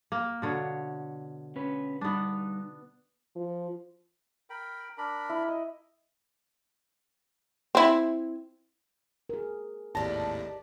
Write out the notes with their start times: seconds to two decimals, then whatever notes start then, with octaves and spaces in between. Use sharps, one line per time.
0.12 A#3
0.42 B2 D3 C#5
1.56 C#4 B4
2.01 G3 B3 D4 D#4
3.36 F3
4.50 A#4 G5 B5
4.98 D4 A#4 B5
5.30 E4
5.48 D#5
7.75 C4 E4
9.29 G#4 A#4
9.95 G#1 D#2 A2 G4 D5 D#5 A5 A#6